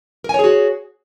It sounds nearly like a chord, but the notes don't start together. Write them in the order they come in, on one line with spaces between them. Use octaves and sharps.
A#4 G#5 C#5 G#4 F#4